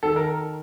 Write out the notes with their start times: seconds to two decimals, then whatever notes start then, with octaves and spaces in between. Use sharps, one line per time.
0.03 D#3 A4
0.16 A#4